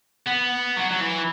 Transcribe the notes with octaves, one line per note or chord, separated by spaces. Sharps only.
B3
F#3
F#3
E3